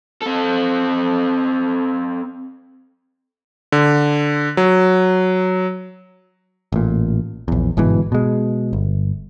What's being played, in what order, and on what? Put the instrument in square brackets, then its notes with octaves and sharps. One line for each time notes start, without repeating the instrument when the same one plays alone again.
[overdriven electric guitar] C4 A4
[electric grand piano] D3
F#3
[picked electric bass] A1 A#2
A#1 E2
G1 G#2 B2 E3
B2 G#3
G1